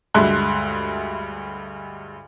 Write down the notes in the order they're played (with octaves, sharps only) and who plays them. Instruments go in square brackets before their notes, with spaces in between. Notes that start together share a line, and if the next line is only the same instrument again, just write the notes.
[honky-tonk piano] D2 G2 G#3 E5 C6 F#6